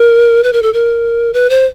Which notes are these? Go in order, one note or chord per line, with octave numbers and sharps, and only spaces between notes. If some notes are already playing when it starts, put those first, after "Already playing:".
Already playing: A#4
B4
A#4
A4
A#4
B4
C5